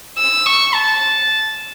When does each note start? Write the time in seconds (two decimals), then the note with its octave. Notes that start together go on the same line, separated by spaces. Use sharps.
0.18 E6
0.46 C#6
0.74 A5